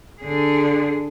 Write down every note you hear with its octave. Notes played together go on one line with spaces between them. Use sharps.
D3 G#4